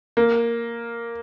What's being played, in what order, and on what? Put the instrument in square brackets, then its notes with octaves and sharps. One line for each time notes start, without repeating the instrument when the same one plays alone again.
[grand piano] A#3